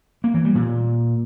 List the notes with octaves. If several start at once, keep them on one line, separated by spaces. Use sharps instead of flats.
A#3
E3
G3
A#2